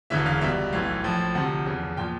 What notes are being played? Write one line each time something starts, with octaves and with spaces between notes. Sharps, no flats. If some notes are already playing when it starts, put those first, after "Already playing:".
E1 D2 C#3 E3 E5
F5
C#2 B2 G3 E5
B1 A2 E3 F5
A#1 A2 F3
D2 C3 F3 F#5
E2 C#3 F3
A#2 F3 G5